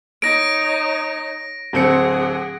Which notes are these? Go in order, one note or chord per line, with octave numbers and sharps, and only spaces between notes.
D#4 C#5 A#6 D7
D1 C4 G#4 F#5 C#7